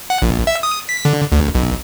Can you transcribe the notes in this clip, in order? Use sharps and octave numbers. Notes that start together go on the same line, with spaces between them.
F#5
A#1
E5
D#6
B6
D3
D2
B1